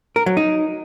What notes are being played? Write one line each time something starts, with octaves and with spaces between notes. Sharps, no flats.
A#4
F#3
D#4